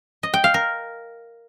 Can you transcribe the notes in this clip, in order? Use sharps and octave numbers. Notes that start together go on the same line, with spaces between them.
D#5
G5
F5
A#4